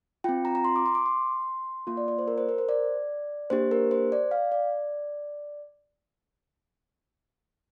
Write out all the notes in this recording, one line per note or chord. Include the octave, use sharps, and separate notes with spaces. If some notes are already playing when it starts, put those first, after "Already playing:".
C4 F4 G5
A#5
A#5
C6
D6
C6
D6
C6
A#3 F4 C6
D5
D5
C5
A#4
C5
A#4
C5
D5
A#3 D4 G4 C5
A#4
C5
D5
F5
D5